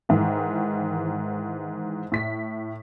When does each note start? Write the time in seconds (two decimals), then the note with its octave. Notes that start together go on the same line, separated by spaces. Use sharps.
0.09 G#2 D#3 E3
2.12 A2 B6